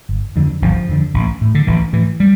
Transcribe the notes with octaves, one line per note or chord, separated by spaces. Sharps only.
G1
F2 D3
G1 F3
F2 D3
A1
A2
D3
A1 E3
A2 E3
G3